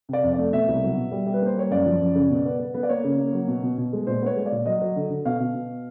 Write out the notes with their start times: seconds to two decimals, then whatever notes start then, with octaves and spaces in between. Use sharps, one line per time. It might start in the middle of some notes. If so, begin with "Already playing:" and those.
0.09 C3 D5
0.23 F2
0.33 D5
0.38 A3
0.53 B2 E5
0.68 C2
0.83 F#3
0.97 B2
1.11 G3
1.26 G3
1.34 B4
1.42 A#3 C5
1.56 G3 C#5
1.71 F#2 D5
1.86 F3
2.01 F#2
2.15 C#3
2.30 B2
2.45 B3
2.59 B3
2.74 B3
2.83 D5
2.89 A#3 C#5
3.04 C#3
3.18 A#3
3.33 F#3
3.47 B2
3.63 B2
3.78 B2
3.93 G#3
4.07 A#2 C5
4.22 B3 C#5
4.36 G#3
4.46 D5
4.52 A#2
4.66 F#3 D#5
4.81 F#3
4.96 D3
5.10 D3
5.25 B2 F5
5.40 B2
5.55 B2